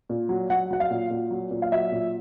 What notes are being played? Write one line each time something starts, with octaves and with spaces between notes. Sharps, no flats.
A#2
F#3
F#3 F#5
F#3 F#5
F5
A#2
A#2
F#3
A#2
F5
F#3 E5
A#2